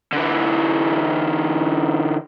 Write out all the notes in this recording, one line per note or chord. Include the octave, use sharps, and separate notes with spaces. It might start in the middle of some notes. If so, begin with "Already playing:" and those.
D3 E3